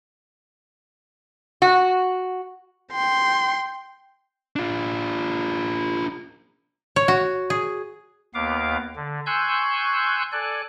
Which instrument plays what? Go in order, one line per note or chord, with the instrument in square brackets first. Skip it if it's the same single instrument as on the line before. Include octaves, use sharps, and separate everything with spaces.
[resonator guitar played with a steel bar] F#4
[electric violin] G5 C6
[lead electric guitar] D4 F4
[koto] C#5
F#4
G#4
[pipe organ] D#2 B3 F5 D6
D3
G#5 C6 C#6 E6 F#6 G6
A4 D5 G#5 F#6